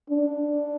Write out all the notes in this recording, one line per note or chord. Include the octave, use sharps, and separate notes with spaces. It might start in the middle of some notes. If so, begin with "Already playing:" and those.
D4